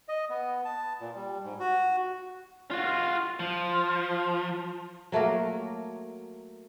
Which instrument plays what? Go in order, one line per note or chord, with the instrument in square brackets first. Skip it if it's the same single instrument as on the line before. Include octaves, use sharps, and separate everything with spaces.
[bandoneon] D#5
B3
A5
A#2
G3
G#2
F#4
[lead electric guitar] F4 F#4
F3
[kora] F#3 A3 A#3 A#4